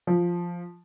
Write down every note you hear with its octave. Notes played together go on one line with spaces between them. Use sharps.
F3